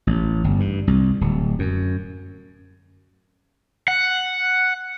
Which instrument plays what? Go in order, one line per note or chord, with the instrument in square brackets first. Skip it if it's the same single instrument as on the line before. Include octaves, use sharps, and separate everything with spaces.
[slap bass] A1
G1
G2
C2
D1
F#2
[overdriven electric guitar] F#5